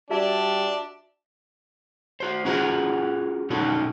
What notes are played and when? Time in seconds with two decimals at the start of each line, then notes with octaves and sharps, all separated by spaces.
0.10 G3 D4 F#4 E5 A5
2.20 F#4 C5
2.45 C#4 F4 F#4 G#4 F#5 A#5
3.50 B2 D3 C#4 D#4 F#4 A4